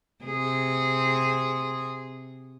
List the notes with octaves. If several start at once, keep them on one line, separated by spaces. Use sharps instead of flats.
C3 G#4